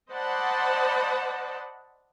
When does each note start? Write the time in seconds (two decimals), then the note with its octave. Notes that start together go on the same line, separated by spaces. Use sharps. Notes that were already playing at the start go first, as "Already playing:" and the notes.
0.11 C5 D5 D#5 F#5 A5 B5